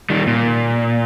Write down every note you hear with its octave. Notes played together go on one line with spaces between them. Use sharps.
D#3 G3
A#2